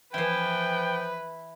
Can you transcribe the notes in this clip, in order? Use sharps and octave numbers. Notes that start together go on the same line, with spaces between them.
E3 F3 E4 B4 G5